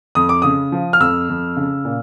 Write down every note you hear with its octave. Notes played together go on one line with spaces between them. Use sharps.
F2 D#6
D6
C#3 D#6
F3
F6
F2 E6
F2
C#3
A#2